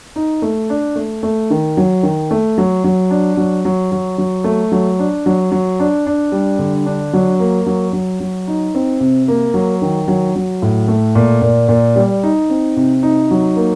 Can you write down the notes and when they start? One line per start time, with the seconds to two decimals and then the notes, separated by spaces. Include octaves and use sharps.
0.16 D#4
0.42 A3
0.70 D4
0.96 A3
1.23 A3
1.50 D#3
1.77 F#3
2.03 D#3
2.31 A3
2.58 F#3
2.84 F#3
3.10 D4
3.37 F#3
3.65 F#3
3.92 F#3
4.18 F#3
4.44 A3
4.72 F#3
4.99 D4
5.26 F#3
5.52 F#3
5.80 D4
6.06 D4
6.32 G3
6.59 D3
6.86 D4
7.13 F#3
7.40 A#3
7.66 F#3
7.93 F#3
8.20 F#3
8.48 D#4
8.75 C4
9.00 C3
9.28 A#3
9.54 F#3
9.82 D#3
10.08 F#3
10.36 F#3
10.62 A2
10.88 A3
11.15 A#2
11.42 A#2
11.69 A#2
11.96 G3
12.23 D#4
12.50 C4
12.77 C3
13.03 D#4
13.31 F#3
13.56 A#3